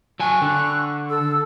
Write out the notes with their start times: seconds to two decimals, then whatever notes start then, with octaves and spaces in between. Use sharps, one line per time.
0.20 F#3 G5 G#5 C#6 F#6
0.42 D3
1.09 A4 E6